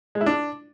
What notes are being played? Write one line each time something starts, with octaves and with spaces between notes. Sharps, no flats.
G#3
E4
D4